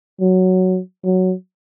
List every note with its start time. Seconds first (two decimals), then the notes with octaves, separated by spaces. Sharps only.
0.21 F#3
1.05 F#3